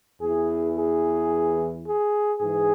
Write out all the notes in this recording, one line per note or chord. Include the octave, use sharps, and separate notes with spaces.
E2 E3 G#4
G#4
G#4
G#2 E3 G#4